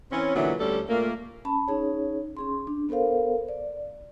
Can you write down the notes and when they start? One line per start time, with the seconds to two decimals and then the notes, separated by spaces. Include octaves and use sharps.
0.12 E3 C4 C#4
0.35 A#2 D3 E3 F#3 B3
0.59 D2 G3 C#4 A4
0.89 A#2 A3 A#3
1.45 C#4 A5 B5
1.68 C#4 D#4 G#4 C#5
2.37 C#4 G#4 C6
2.67 D4
2.89 B3 A4 A#4 C5 F5
3.49 D5